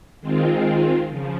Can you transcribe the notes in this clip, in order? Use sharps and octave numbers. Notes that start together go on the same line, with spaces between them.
D#3 G#3 C4 F4
C#3 F3